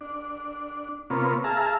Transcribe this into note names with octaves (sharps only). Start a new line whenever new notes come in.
D4
C3 A#3 B3 C#4 F4
G#4 E5 F5 A5 A#5